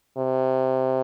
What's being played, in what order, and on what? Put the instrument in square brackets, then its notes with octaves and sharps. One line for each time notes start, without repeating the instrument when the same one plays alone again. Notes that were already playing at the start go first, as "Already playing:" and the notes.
[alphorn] C3